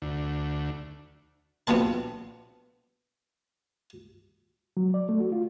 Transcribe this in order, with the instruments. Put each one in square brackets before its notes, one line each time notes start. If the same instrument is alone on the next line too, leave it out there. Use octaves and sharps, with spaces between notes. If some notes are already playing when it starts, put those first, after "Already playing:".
[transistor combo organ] D2
[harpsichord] A#1 B2 B3 C4 A5
[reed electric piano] F#3
D5
A3
F#4
F4